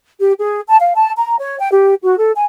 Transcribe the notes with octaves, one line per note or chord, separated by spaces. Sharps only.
G4
G#4
A5
F5
A5
A#5
C#5
G5
G4
F#4
A4
G#5